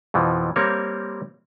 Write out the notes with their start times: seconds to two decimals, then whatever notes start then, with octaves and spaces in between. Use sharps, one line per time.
0.14 F2 B2 E3 F3
0.56 G3 A#3 C4 A#4 C#5 F5